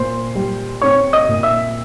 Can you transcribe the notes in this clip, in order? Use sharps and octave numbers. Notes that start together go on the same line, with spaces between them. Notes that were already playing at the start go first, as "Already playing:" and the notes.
Already playing: A#2 C5 C6
G3
C4 C#5 C#6
D#5 D#6
A#2
E5 E6